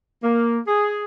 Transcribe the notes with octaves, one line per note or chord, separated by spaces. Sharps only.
A#3
G#4